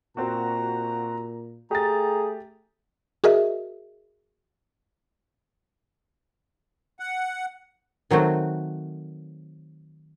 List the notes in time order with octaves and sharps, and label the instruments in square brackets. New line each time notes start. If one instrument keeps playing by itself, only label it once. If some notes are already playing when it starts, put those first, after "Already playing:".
[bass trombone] A#2 [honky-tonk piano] C4 F#4 [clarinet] A#5
[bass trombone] A3 [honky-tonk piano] G4 A6 [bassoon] G#4 [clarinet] A#5
[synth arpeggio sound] F#4 G#4 A#4 D#5 E5
[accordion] F#5
[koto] D#3 F#3 A3 C4 F#4